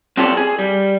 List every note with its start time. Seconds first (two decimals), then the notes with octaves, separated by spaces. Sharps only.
0.17 C4 F4 G4 A4 C#5 D5
0.37 G#4
0.59 G3